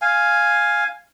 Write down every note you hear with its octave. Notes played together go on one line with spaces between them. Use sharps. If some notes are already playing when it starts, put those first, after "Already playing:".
F5 G#5